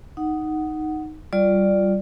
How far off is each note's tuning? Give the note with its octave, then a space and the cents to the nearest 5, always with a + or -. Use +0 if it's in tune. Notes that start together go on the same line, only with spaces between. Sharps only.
D#4 +0 F#5 +5
G3 -15 F4 +0 D5 +5